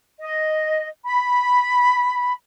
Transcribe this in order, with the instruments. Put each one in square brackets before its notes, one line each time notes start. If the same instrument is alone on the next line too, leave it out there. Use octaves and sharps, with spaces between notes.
[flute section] D#5
B5